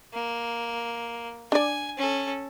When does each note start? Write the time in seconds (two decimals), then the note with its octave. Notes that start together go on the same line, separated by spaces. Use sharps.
0.14 A#3
1.52 D4 D5 G#5
1.98 C#4 A4